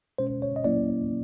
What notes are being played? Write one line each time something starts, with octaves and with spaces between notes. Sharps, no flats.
B2 G#3 C#4 C5
C#5
D#5
A#2 F#3 A#3 C#4 E4 D5